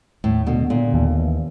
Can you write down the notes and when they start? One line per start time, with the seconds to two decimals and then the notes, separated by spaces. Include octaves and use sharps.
0.24 D#2 A2
0.47 B2 D3
0.70 A#2 D3
0.93 D#2
1.18 E3